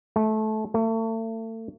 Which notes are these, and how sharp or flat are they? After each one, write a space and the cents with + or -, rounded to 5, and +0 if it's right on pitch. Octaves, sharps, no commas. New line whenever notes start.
A3 -20
A3 +35